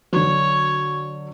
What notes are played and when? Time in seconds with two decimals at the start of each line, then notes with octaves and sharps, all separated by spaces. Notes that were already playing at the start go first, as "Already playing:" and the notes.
0.13 D3 F#3 C#5